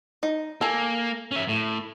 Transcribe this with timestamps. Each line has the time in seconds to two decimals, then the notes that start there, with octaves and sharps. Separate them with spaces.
0.23 D#4
0.61 A#3 A4 G#5
1.31 C#4 E5
1.48 A2